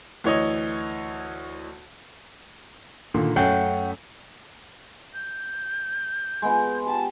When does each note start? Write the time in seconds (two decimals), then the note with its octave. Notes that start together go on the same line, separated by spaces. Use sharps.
0.24 D2 E3 C#5 D#5
3.14 A#2 D3 D#3
3.36 F#2 A3 C#4 C#5 F#5 G5
5.14 G6
6.42 G#3 B3
6.86 G4 A5